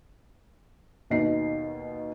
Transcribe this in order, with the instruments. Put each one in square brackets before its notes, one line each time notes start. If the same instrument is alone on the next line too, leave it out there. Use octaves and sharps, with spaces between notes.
[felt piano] D#2 B2 D#4 C7